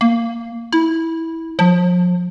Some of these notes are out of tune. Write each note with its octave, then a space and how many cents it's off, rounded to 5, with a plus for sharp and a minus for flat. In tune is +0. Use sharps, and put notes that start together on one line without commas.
A#3 -10
E4 -15
F3 +35